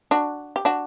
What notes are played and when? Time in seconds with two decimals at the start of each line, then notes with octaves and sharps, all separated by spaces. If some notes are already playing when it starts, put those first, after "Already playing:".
0.11 D4 F#4
0.56 G4
0.65 D4 F#4